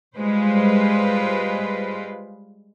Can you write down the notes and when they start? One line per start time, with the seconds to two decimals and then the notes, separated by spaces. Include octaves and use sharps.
0.15 G3 G#3 F4 B4 C5